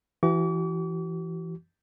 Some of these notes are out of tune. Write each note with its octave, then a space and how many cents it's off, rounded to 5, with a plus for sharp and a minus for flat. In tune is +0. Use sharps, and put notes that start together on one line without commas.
E3 +15 F#4 +45 D6 -45